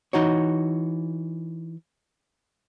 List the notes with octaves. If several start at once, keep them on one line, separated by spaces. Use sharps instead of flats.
E3 D#4 F#4 C#5